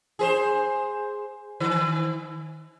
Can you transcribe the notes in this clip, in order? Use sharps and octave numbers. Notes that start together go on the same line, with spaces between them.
G#4 B4 C5
D#3